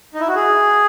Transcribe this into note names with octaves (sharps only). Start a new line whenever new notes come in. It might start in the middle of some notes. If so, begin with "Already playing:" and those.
D#4
E4
F#4
G#4